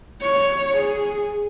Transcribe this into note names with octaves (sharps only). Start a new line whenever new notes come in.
C#5
G#4